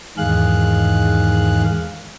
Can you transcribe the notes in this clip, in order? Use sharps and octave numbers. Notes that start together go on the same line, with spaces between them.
E2 G#2 D#3 G#4 F5 F#6